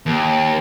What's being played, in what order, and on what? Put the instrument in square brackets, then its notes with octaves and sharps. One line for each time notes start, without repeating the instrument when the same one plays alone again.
[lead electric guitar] D#2